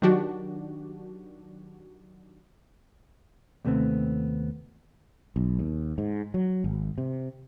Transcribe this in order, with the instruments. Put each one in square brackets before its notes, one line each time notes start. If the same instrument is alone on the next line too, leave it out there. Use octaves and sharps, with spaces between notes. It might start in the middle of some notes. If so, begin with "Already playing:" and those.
[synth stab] D#3 F#3 D4 F#4 G4
[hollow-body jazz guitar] D#2 C3 A3 B3 C4
[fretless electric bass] B1
D#2
G#2
F#3
G#1
C3